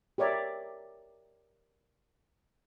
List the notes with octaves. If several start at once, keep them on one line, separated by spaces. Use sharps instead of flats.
G4 A#4 C#5 D5 E5